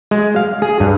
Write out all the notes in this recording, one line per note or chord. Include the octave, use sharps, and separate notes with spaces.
G#3
F5
G#4
G2